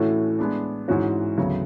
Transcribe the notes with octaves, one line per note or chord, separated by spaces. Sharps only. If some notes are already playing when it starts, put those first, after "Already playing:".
Already playing: A2 E3 A3 C#4 F#4
G#3 B3 D4
G#2 E3 G#3 C#4 F#4
D2 C#3 F#3 B3